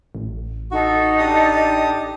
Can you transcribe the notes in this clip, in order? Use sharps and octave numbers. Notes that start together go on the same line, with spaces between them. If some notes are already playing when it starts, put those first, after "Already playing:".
A1
D#4 F#4 A4
D4 G4 D#6